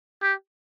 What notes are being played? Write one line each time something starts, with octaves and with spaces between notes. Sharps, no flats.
G4